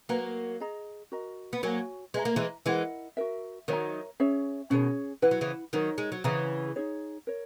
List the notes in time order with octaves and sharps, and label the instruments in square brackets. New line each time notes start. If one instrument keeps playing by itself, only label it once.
[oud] F#3 A#3 [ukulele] B4 F#5 A#5
[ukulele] G#4 D#5 A#5
F#4 A#4 D#5 A#5
[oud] B3
[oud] F#3 A#3 [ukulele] F#4 C#5 G#5
[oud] G#3 [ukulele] B4 E5 A#5
[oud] A#3
E3 G#3
[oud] E3 G#3 [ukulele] E4 A#4 D#5 F#5
[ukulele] F#4 A#4 E5
[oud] D#3 F#3 [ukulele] A#4 C#5 E5 A#5
[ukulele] C#4 G#4 C#5 E5
[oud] B2 D#3 [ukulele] C#4 G#4 C#5
[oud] E3 [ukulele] E4 B4 F#5
[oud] F#3
C#3 E3
[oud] D#3 F#3 [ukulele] D#4 A#4 C#5
[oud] G#3
F#3
[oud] C#3 E3 [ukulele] G#4 C#5 F#5 A#5
[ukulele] D#4 G#4 C#5
A#4 C#5